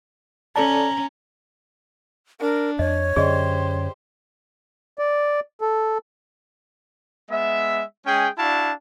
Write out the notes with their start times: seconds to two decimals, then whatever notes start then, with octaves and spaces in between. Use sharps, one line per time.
0.56 C#4 A4 D5 A5 A#5
2.40 D4 A#4
2.79 F2 C#5 D#5
3.16 F#2 D3 C#4 G4 G#4 C5 D5 D#5
4.99 D5
5.61 A4
7.31 G#3 B3 E5
8.07 G#3 C#4 G#4 G5
8.39 D4 E4 F#4 F5 A5